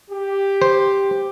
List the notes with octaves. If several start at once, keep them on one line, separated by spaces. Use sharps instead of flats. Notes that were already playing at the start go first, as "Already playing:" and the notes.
G4
C5